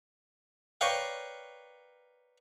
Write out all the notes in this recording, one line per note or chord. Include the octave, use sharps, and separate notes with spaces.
A#4 B4 C#5 D5 F5 G5